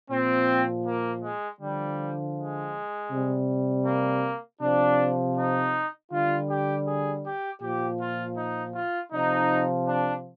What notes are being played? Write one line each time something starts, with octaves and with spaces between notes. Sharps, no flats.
A#2 F3 C4
A#3
G#3
D3 F3 G3
G#3
C3 G3
A#3
C3 F3 D4
D#4
D3 G3 F4
G4
G#4
G4
A#2 F3 G4
F4
D#4
F4
C3 F3 D#4
D4